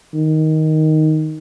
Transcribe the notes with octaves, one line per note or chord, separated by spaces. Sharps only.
D#3